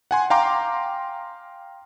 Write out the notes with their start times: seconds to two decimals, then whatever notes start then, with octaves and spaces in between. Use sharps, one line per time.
0.11 F#5 G#5 C6
0.30 F5 G5 A#5 C6 D6